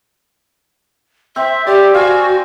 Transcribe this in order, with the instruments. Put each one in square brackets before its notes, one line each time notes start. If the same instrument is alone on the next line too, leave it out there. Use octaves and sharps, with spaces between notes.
[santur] C4 [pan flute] E5
[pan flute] G4 [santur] D5 G5
[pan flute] F#4 [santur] F5 G#5